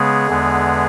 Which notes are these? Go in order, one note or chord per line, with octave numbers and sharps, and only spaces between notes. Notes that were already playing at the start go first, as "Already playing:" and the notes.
Already playing: C#3 G#3 B3 G#4
E2 D3 G#3 B3